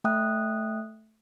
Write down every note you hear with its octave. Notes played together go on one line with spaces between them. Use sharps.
A3 E5 G5 D#6 F#6